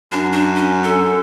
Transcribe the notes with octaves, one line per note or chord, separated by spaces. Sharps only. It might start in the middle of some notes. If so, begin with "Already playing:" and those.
F#2 D4
D4
C#4
A4